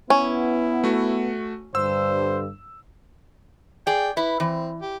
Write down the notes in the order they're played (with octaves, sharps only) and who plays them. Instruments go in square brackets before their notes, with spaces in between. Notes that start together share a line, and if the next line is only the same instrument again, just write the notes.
[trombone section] B3 [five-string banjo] C#4 [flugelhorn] E4
[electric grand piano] A3 F#4
[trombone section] G2 D3 [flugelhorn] C5 [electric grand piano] E6
[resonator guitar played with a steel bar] G#4 D5 [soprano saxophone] G5
[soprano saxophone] E4 [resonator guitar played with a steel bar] B4
[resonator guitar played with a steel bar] E3 [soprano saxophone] C4
[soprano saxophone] G4